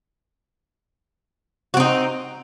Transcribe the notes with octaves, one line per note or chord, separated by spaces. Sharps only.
C4 D#4 F#4